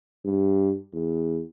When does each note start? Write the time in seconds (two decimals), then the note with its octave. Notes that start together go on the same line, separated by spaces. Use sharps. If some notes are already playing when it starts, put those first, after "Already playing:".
0.25 G2
0.93 E2